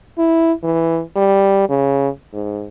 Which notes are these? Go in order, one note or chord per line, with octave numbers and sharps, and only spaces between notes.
E4
E3
G3
C#3
G#2